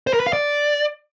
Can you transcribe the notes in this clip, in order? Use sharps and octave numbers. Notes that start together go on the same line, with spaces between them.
C5
A#4
B4
F5
D5